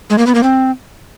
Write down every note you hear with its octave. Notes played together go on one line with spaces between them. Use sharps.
G#3
A#3
B3
A#3
C4